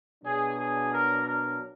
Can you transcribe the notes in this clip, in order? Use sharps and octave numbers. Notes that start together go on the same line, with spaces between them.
B2 F#3 D4 G#4
G#4
A#4
A#4